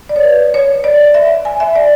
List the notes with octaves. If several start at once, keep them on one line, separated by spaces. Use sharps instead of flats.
D5
C#5
B4
C#5
D5
E5
G#5
E5
D5